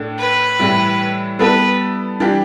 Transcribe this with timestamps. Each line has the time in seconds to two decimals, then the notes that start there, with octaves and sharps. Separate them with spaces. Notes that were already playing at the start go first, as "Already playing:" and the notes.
Already playing: A2 A3 D4
0.19 B4
0.59 A2 E3 G3 E4
1.39 G3 B3 E4 A4 B4
2.20 E3 G3 D4 G4